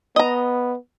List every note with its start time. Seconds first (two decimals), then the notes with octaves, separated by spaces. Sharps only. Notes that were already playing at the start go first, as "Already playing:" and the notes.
0.16 B3 D#5 A#5